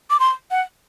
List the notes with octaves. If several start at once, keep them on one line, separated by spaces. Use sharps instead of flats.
D6
C6
F#5